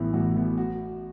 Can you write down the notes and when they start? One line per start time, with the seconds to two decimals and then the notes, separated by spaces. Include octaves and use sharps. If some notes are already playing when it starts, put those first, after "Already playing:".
Already playing: A1 A2 E3 B3
0.13 A1 F#4
0.36 A2 E3 B3
0.58 F#4